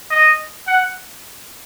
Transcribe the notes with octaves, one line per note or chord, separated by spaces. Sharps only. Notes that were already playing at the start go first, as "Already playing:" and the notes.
D#5
F#5